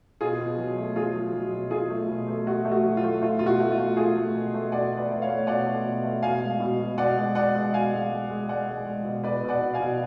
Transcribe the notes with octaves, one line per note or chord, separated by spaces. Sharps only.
B2 F4 G#4
B2
F#3
A3
F#3 F4 G#4
F#3
F#3
B2
F#3 F4 G#4
A3
B2
A3
A3 F#4
A3
F#4
F#3
F4
A3
A3 F4
B2 F4
F#4
A3
F4
A3
A3 F4 G#4
A3
B2
A3
B2 D5 F#5
B2
B4 D5
A3
C#5 F5
A3
B2 D5 F#5
A3
B2
A3
B2 F5 G#5
G#3
B2
B2
B2 D5 F#5
G#3
B2 D5 F#5
G#3
B2 F5 G#5
G#3
G#3
G#3
G#3 D5 F#5
G#3
G#3
B2
B2 B4 D5
B2
D5 F#5
B2
F5 G#5
B2